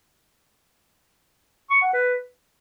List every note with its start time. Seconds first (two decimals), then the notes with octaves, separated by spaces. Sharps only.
1.71 C#6
1.82 F#5
1.93 B4